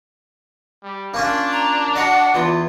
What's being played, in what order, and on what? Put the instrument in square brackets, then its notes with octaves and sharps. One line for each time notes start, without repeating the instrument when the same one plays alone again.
[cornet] G3
[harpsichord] A#3 C#4 F4 [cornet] D4
[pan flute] A#5
[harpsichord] F#4 D#5 [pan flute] F#5
[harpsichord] E2 [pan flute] F4